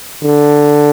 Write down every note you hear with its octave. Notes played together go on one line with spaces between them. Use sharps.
D3